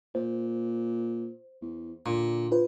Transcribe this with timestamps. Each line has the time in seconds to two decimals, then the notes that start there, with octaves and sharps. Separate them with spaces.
0.15 A#2 C5
1.61 E2
2.06 A#2 D3
2.51 F4 B4 C5